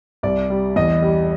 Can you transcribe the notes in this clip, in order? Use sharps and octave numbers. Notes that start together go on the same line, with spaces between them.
C2 D5
G3
E2 D#5
G3